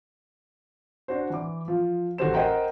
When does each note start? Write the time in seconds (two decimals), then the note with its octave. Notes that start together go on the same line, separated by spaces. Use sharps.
1.08 D4 F#4 C5
1.30 E3 D6
1.68 F3
2.18 A1 F#4 G4 A4 C5 E7
2.34 A#4 C5 D#5 F#5 G5 A#5